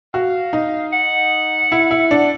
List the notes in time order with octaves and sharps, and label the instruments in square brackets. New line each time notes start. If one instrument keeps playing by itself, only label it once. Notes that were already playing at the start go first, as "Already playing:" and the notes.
[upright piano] F#4 [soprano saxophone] F5
[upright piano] D#4
[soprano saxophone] F#5
[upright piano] E4
E4
D4